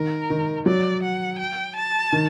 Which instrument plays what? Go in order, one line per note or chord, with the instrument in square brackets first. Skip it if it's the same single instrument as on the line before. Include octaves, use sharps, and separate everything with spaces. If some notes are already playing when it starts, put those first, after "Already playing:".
Already playing: [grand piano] D#3 [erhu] A#4
[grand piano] D#3
[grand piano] F#3 [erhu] D5
[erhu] F#5
G5
A5
[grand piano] D#3